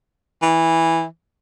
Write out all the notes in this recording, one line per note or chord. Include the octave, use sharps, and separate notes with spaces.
E3